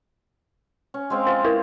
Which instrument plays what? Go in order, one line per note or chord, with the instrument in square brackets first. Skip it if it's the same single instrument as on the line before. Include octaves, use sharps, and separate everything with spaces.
[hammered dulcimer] C#4
G#3 C4 F5
[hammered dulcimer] F4 [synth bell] C5
[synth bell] E4 A#4 B4